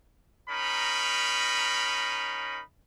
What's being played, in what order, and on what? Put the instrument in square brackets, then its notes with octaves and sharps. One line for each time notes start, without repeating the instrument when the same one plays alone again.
[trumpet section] C#4 D#4 A#4 B5